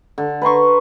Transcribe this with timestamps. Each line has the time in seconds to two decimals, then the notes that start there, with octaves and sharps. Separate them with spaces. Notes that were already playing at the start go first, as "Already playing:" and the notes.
0.18 D3
0.42 B4 A#5 C6 C#6